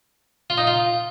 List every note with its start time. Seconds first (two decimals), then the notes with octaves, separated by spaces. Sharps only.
0.50 F4
0.58 D#4
0.67 F4